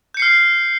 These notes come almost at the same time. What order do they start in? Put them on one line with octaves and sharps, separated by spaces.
G6 C#7 C7 F6